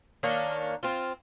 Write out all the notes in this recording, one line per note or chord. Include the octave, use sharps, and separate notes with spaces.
D#3 A#3 C#4 D4
C4 F4